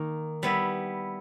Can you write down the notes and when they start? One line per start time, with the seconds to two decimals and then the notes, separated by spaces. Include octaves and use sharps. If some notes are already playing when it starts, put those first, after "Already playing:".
Already playing: D#3 A#3 D#4
0.43 G3 B3 E4